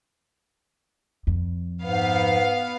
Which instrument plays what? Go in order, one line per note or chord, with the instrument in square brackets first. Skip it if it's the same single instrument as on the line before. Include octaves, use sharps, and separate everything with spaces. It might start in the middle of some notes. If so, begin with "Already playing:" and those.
[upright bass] F2
[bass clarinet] G#2 [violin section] B3 F5